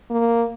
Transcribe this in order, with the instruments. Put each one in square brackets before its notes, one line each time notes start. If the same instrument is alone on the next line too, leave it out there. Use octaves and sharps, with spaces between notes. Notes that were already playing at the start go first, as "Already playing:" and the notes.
[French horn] A#3